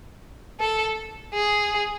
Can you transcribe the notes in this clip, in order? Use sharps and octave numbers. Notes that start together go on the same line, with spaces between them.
A4
G#4